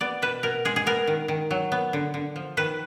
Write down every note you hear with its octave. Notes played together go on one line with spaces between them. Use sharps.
B3 D5
B2 B4
B2 A#4
G#3 G#4
G#4
B3 A#4
D#3
D#3
F#3
B3
D3
D3
F3
D#3 B4